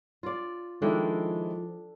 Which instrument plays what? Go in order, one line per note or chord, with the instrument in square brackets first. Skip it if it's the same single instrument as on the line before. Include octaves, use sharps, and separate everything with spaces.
[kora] F4 D5
[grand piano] D#3 G#3 E4 [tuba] F3 [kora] D4 A4 G5